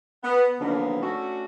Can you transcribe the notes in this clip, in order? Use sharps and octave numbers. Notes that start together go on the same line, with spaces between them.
B3
D3 D#3 F3 F#3 A#3 B3
A3 C#4 D4 F#4